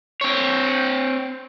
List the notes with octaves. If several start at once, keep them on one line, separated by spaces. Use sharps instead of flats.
C4 C#5